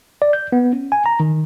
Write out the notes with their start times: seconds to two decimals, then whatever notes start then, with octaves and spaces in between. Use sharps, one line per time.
0.22 D5
0.33 G6
0.52 B3
0.73 C#4
0.92 G#5
1.06 A#5
1.20 D#3